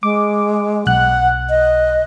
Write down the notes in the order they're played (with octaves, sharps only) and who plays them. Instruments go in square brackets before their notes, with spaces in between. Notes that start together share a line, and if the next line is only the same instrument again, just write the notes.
[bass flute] G#3 [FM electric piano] D6
[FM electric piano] B1 F#6 [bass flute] F#5
[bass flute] D#5